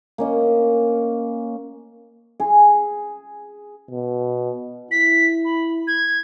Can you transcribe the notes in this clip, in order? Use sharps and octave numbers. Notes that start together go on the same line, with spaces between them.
A#3 C#4 D#5
G#4
B2
E4 B6
B5
G#6